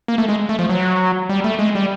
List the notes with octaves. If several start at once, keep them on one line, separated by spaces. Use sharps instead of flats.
A#3
A3
G#3
A3
F3
F#3
G3
A3
G#3
G3